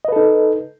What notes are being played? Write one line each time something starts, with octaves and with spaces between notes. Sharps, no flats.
D#4 A4 B4 D#5